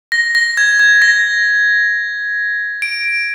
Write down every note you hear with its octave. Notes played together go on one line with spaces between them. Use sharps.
A#6
A#6
G#6
G#6
A#6
D7